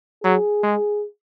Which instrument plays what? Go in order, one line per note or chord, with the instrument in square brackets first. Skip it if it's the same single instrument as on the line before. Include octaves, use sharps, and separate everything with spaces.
[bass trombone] F#3 [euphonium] G#4
[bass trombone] G#3